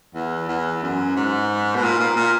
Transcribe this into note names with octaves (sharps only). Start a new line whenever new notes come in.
E2
E2
F#2
G#2
B2
A#2
A#2
A#2